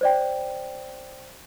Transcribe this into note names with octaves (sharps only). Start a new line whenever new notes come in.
C5 D5 G5